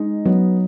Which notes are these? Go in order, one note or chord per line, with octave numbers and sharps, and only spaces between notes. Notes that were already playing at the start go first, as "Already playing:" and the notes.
Already playing: G#3 D#4
F#3 B3